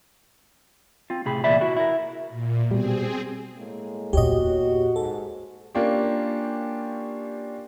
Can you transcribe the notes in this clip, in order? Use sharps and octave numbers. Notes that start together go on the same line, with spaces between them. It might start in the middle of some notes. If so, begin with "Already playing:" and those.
C4 F4
A2 C3 G#4 B5
E2 A#2 B4 D5 E5 B5
E4 F#4
E4 A#4
A#2
B2 G3 C4 G#4
A2 G#3 A#3
E2 A#2 F#4 G4 C#5 D#5
G#2 A4
A#3 C#4 D4 F4 G4